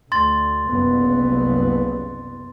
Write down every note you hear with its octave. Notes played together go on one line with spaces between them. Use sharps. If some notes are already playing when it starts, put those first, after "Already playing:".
D2 C6 A6
F#1 C2 B3